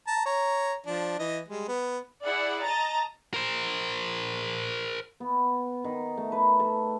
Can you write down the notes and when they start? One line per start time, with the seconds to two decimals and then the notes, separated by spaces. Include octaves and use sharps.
0.07 A5 A#5
0.26 C#5 A#5
0.86 F3 D4
1.19 E3 D#5
1.48 G3 G#3
1.69 B3
2.24 E4 G#4 D5 F#5
2.64 D#5 A5 A#5 A6
3.34 A#4 C5
5.20 B3
5.84 D#3
6.17 A3
6.32 B4
6.60 A4